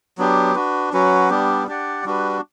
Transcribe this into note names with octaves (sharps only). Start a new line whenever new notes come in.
F#3 B3 D4 G4
D4 F#4 B4
F#3 C#4 F#4 B4
G3 B3 D4 G4
D4 G4 D5 F#5
G3 D4 F#4 B4